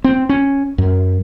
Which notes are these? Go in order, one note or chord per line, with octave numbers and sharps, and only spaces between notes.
C4
C#4
F#2